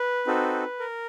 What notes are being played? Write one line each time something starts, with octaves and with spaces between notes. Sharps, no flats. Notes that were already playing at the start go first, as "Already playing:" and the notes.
Already playing: B4
C4 D#4 F#4 A4
A#4